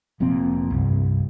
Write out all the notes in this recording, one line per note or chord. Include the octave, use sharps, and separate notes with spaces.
F1 F2 A#2 C4
C2 G2